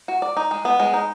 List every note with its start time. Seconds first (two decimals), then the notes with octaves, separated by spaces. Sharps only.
0.08 F#4
0.22 D5
0.37 D#4
0.51 G#3
0.65 B3
0.80 G#3
0.94 D#4